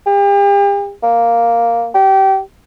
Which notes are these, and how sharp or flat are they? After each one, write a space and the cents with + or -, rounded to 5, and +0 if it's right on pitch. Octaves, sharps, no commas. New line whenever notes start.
G4 +40
A#3 +0
G4 -25